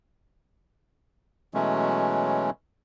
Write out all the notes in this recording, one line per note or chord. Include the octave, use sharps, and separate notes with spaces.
B2 E3 F#3 G#3 A3 C#4